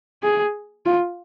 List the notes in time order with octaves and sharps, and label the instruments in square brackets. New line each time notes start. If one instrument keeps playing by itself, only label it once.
[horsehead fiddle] G#4
F4